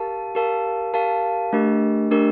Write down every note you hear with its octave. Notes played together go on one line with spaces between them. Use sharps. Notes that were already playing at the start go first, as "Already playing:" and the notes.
Already playing: G4 A#4 F5 A5
G4 A#4 F5 A5
G4 A#4 F5 A5
A3 D4 G4 A#4
A3 D4 G4 A#4